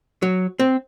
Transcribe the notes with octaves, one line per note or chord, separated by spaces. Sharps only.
F#3
C4